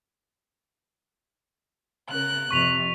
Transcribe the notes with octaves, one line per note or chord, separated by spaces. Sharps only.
C#3 A#4 F#6
F2 C3 C#6 B6 F7